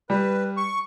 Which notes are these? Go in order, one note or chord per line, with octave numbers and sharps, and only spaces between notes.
G3 B4
C#6